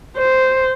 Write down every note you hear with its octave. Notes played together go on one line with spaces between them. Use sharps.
C5